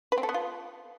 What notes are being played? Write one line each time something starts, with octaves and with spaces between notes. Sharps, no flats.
B4
C4
A4
B3
F4